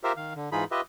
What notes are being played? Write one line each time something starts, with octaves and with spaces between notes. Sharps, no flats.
F4 G4 A#4 C5 E5
D#3 F5
D3
G#2 E3 D#4 F4 G#4 B5
F4 G4 B4 D#5 E5